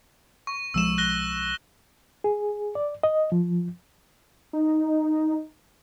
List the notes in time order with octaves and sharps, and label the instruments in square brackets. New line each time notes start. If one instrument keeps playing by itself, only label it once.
[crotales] C#6
[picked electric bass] B1 F3 G#3 [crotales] E6 E7
[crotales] F#6 A#6 G7
[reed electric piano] G#4
D5
D#5
F3
[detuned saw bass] D#4